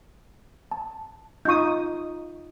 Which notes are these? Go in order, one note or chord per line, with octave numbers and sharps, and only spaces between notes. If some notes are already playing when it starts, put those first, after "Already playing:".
A5
D#4 F4 C#6 D#6 G6